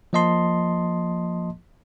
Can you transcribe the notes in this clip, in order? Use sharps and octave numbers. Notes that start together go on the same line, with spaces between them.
F3 A#3 D#5 A5 C6